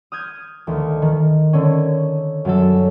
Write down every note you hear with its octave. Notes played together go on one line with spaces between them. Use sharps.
D#6 F6 G6 G#6
D2 D#3
D#3
D3 C#4
F#2 F#3 A4